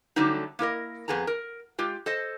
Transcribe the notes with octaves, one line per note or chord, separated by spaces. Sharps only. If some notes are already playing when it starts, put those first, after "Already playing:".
D3 F#3 G3 A3 D#4
A#3 E4 A#4 D#5
F2 B3 G#4 A4 A#5
A#4
G#3 F4 G4
A4 C5 D#5